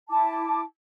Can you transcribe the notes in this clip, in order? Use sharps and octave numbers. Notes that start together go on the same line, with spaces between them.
E4 A5 D6